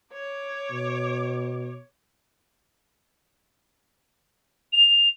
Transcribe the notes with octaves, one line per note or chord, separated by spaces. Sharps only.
C#5 D6
B2
F7